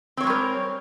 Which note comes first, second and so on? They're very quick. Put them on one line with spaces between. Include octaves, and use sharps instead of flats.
C4 C#5 G#3 G3 A#4